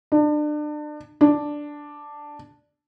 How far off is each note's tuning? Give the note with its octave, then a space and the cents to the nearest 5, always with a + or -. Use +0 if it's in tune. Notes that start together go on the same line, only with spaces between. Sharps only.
D4 +30
D4 +0